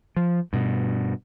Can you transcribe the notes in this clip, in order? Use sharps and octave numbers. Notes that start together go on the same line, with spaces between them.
F3
G2 B2